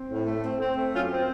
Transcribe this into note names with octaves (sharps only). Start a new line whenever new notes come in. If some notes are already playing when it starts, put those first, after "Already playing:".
Already playing: C4
A2
A3
C4
C4
A3
F#2 C#4 F4
C4